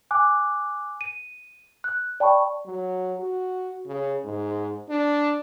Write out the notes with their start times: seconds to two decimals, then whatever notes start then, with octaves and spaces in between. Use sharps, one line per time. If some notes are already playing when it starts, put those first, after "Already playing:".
0.11 G#5 D6 F#6
1.01 D#7
1.84 F#6
2.20 D5 G5 A5 B5 C#6
2.65 F#3
3.19 F#4
3.86 C#3
4.24 G#2
4.89 D4